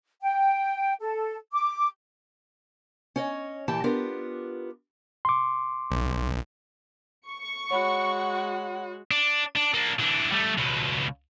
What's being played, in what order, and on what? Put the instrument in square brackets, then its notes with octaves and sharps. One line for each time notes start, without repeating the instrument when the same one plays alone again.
[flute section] G5
A4
D6
[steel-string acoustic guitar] C#4 C#5 D#5
A#2 E3 E4 G4 G5 A5
B3 D4 F4 G4 A#4
[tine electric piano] C6 D6
[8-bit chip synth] B1
[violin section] C#6
[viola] G#3 F#4 [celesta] C#5 B5 [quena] F#5
[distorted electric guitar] D4
D4
A#3 D4
E3 D4
G3 A3
C#2 B2